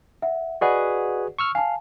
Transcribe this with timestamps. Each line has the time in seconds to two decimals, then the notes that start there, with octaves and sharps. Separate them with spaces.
0.22 E5 F#5
0.61 F#4 G#4 B4 D5 D#5 F#5
1.39 C#6 E6 F6
1.55 F5 G#5 A5